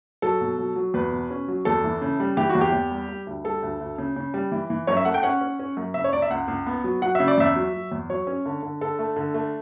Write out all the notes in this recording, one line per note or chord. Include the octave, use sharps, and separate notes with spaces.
F#3 A4
B2
F#3
F#3
E2 B4
B2
C#4
F#3
E2 A4
E3
C#3
G3
E3 G4
F#4
E2
G4
E2
G3
G3
D2
G3 A4
D2
D2
C#3
C#3
G3
E3
E3
F#2 C#5
E5
A3 F#5
G5
C#4 F#5
C#4
C#4
F#2
C#3 E5
C#5
C#2 D5
E5
C#2 F#5
C#2
B3
F#3
F#3 F#5
C#3 E5
D5
E2 E5
F#3
F#3
E2
F#3 C#5
C#4
D3
D3
D3 A4
A3
D3
A3